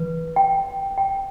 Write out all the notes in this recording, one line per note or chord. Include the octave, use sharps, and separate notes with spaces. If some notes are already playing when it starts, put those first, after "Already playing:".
Already playing: E3 B4
G5
G5